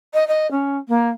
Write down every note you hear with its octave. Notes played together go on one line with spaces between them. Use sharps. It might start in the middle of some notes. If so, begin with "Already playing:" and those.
D#5
D#5
C#4
A#3